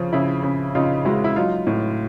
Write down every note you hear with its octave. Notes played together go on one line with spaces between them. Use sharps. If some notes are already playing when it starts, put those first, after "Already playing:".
Already playing: C#3 F3
C#3 E4
C#3
C#3 D#4 F4
G#3 E4 F#4
E4
F#3 D#4 F4
A2